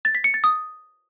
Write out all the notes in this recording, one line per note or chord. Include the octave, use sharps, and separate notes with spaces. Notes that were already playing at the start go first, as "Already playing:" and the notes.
A6
B6
C#7
A6
D#6